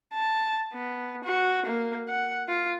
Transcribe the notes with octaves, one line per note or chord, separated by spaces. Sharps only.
A5
B3
F#4
A#3
F#5
F4